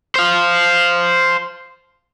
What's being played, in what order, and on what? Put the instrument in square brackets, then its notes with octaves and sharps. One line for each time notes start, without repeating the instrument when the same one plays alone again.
[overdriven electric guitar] C5 F5